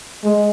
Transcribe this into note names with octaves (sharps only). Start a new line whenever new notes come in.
G#3